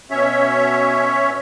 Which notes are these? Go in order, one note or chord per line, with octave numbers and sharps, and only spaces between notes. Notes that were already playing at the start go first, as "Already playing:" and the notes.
B2 C#4 C#5 E5